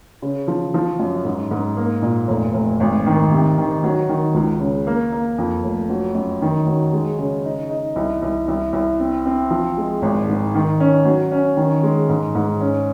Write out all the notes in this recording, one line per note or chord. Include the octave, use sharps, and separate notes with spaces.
C#3
F3
F3
F#2
G#2
G#2
A#3
A#2
F1
F1
G#1
D#3
C3
D#3
F#3
D#3
C#2
C#3
A#3
A#3
F2
F1
F#3
F#2
D#3
F#3
G#3
C#3
D#4
D#4
C2
C2
C2
C2
C4
C4
F3
G#3
G#1
G#2
D#3
C#4
F#3
C#4
D#3
G#3
G#2
G#2
C#4